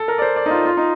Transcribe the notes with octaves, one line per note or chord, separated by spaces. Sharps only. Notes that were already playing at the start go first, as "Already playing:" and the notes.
Already playing: A4
A#4
D5
C5
D5
D#4
F4
F4
D#4